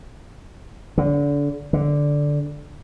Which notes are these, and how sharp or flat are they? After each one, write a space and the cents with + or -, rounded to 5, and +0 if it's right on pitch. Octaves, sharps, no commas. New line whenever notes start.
D3 -30
D3 -5